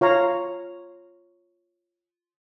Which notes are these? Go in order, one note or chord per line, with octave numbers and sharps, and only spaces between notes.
F4 C#5 F5 A#5